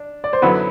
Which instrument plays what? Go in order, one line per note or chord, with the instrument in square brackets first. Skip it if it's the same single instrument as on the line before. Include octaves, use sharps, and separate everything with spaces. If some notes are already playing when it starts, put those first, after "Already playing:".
Already playing: [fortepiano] D4
[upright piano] D5
C5
[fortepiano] F#2 D3 F#3 B3 E4 [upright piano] B4